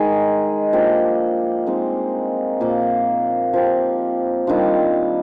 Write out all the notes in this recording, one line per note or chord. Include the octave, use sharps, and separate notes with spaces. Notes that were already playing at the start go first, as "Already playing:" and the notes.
Already playing: D#3 G#3 D#4 G#4
F3 A#3 D4 G4
G#3 C4 D#4
A#2 F3 A#3 F4
F3 C4 G4
D#3 G3 D4 F4